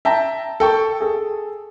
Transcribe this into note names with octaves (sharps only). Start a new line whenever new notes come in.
E5 G5 A5 A#5
A4 G5 C#6
G#4 A4